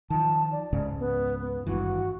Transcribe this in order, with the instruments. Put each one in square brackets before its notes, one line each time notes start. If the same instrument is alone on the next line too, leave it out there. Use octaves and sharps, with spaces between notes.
[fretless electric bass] D#3 F3 [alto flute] A5
[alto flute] D5
[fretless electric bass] C#2 G#2 C#3
[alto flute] B3
B3
[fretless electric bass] G#1 G2 E3 [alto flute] F#4